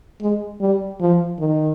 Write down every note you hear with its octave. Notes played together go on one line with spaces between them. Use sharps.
G#3
G3
F3
D#3